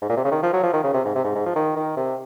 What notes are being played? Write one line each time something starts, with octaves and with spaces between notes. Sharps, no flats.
G#2
A#2
C3
C#3
D#3
F3
F#3
F3
D#3
C#3
C3
G#2
C3
G#2
G#2
F3
D#3
D#3
C3